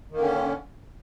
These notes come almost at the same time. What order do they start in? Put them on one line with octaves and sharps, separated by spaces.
D#3 A#3 D3 C#4